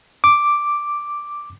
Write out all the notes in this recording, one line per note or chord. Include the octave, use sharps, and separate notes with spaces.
D6